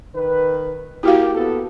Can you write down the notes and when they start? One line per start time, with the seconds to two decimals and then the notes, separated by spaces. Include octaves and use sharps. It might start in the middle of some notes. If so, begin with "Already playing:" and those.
0.15 D#3 B4
1.03 A#3 E4 F#4 G4 F5
1.35 B3 A4